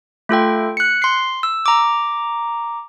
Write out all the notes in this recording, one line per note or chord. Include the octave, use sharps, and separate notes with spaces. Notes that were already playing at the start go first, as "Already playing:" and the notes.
A3 F4 A4 G5
F#6 C#7
C6 C7
E6
A#5 D6